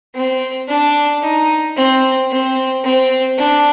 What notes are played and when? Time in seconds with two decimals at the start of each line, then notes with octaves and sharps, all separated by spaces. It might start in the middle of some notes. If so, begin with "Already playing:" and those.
0.15 C4
0.69 D4
1.22 D#4
1.76 C4
2.30 C4
2.84 C4
3.38 D4